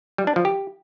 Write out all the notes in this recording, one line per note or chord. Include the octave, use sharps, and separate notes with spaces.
G3
D4
F3
G4